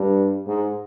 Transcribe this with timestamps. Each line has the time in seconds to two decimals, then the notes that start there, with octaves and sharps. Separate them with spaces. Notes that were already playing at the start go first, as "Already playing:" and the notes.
Already playing: G2
0.46 G#2